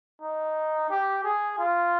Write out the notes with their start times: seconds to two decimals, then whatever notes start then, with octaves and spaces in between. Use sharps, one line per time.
0.21 D#4
0.90 G4
1.24 G#4
1.59 F4